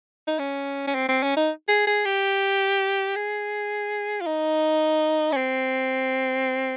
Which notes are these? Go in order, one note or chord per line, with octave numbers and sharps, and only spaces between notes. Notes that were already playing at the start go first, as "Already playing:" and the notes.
D#4
C#4
C#4
C4
C4
C#4
D#4
G#4
G#4
G4
G#4
F4
D#4
C#4
C4